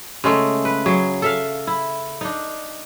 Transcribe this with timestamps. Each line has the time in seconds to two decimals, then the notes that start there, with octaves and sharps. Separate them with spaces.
0.24 C#3 G#3 A3
0.65 B4
0.86 F#3 G#4
1.22 A4 E5 F5
1.67 E4
2.21 D4 D#4